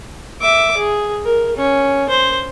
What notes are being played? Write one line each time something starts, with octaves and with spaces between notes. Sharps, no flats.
E5 D6
G#4
A#4
C#4
C5